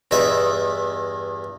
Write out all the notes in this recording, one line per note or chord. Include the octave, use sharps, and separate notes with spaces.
E2 G2 D#5 E5 B5